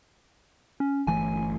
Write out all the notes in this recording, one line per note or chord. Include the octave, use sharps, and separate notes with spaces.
C#4
G1 E3 A3 G#5